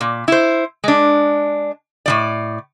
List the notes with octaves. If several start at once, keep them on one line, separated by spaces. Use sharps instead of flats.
A#2
E4 C5
G#3 D4
A2 F3 D5